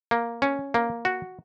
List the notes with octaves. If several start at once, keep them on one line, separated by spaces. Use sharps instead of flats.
A#3
C#4
A#3
F#4